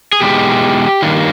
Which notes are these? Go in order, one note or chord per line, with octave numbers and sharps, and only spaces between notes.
G#4
E2 B2 G#3 D#4 G4
G2 D#3 A#3